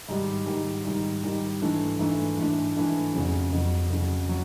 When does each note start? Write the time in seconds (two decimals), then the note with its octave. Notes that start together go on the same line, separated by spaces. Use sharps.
0.09 G#2 D#3 G3
0.46 G#2 D#3 G3
0.85 G#2 D#3 G3
1.24 G#2 D#3 G3
1.62 G#2 E3 A3 D4
1.99 G#2 E3 A3 D4
2.37 G#2 E3 A3 D4
2.76 G#2 E3 A3 D4
3.14 F2 C#3 F#3
3.53 F2 C#3 F#3
3.90 F2 C#3 F#3
4.29 F#3